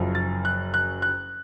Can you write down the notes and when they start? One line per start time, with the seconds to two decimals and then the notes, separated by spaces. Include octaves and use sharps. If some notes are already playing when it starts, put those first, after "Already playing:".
Already playing: F#1 F#2 F3
0.15 A6
0.45 F#6
0.74 F#6
1.02 F#6